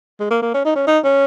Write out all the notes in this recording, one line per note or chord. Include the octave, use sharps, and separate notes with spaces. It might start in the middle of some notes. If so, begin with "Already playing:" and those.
G#3
A#3
A#3
C#4
D#4
C#4
D#4
C#4